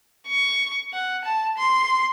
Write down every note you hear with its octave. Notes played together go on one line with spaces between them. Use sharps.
C#6
F#5
A5
C6